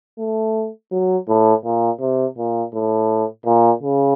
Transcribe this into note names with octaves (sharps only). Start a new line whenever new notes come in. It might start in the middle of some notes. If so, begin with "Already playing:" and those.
A3
F#3
A2
A#2
C3
A#2
A2
A#2
C#3